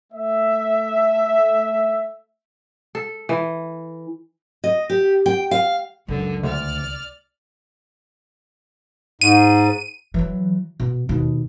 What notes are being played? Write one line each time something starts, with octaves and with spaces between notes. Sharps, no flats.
A3 E5
A4
E3
D#5
G4
G5
F5
C#2 F#2 D3
D2 D5 F6
G#2 D#7
E3 F#3
B2
D#2 B2